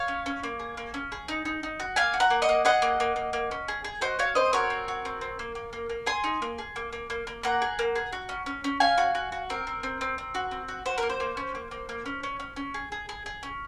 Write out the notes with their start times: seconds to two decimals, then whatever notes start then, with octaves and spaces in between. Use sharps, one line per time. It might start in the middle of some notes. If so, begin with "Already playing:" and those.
Already playing: C#5 F5
0.08 C#4
0.26 C#4
0.43 A#3
0.60 G#4
0.77 A#3
0.94 C#4
1.12 G#4
1.28 D#4
1.45 D#4
1.63 D#4
1.80 F#4
1.96 A#3 F5 G#5
2.14 F#4
2.20 F#5 A#5
2.30 A#3
2.42 D#5 F#5
2.49 A#3
2.65 G#4 D#5 F#5
2.82 A#3
3.00 A#3
3.16 A#3
3.33 A#3
3.51 C#4
3.68 G#4
3.84 G#4
4.01 F#4 C5 D#5
4.19 F#4 C#5 F5
4.35 C4 C5 D#5
4.53 F#4 A#4 C#5
4.70 C4
4.88 F#4
5.05 C4
5.21 C4
5.39 A#3
5.55 A#3
5.73 A#3
5.90 A#3
6.06 G#4 G#5 C6
6.24 D#4
6.42 A#3
6.58 G#4
6.76 A#3
6.93 A#3
7.10 A#3
7.27 A#3
7.43 A#3 F#5 A#5
7.62 G#4
7.79 A#3
7.96 G#4
8.13 F#4
8.29 C#4
8.46 C#4
8.64 C#4
8.80 C#4 F5 G#5
8.98 F#4
9.15 F#4
9.32 F#4
9.50 C4 A#4
9.67 C4
9.83 C4
10.01 C4
10.18 C4
10.35 F#4
10.51 C4
10.68 F#4
10.86 F#4 C5
10.98 A#3 A#4
11.10 C5
11.20 A#3
11.37 C#4
11.55 A#3
11.71 A#3
11.89 A#3
12.06 C#4
12.23 C#4
12.40 C#4
12.56 C#4
12.74 G#4
12.92 G#4
13.09 G#4
13.26 G#4
13.43 C#4